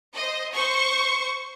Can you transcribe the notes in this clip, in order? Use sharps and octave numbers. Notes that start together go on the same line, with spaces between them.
C5 D#5
C5 C#6